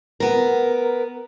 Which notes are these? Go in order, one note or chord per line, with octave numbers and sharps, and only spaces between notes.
B3 A#4